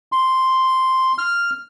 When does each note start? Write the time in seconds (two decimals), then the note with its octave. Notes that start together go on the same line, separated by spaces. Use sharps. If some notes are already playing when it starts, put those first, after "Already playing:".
0.12 C6
1.18 F6